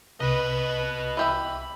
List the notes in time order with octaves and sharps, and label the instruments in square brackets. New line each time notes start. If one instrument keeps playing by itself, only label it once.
[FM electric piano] C2 C3 [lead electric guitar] F#4 D#5 [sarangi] B4
[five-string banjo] E3 G4 E5 [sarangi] B5